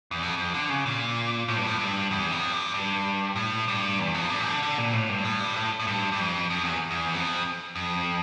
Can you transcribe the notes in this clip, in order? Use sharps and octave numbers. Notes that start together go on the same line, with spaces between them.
E2
F2
F2
D3
C#3
A#2
A2
G2
A2
G2
E2
F2
G2
G2
A2
G2
E2
F2
G2
D3
D3
A#2
A2
G2
A2
G2
A2
A2
G2
G2
F2
F2
E2
E2
F2
F2